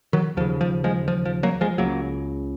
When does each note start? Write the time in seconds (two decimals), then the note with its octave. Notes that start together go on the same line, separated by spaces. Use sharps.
0.13 D#3 F#3
0.37 D#2 F3
0.41 C#3
0.61 F3
0.84 F3 G#3
1.08 F3
1.25 F3
1.43 F#3 A#3
1.61 F3 G#3
1.78 C#2 C#3 F#3 A#3